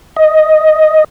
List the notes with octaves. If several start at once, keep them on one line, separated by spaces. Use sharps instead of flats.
D#5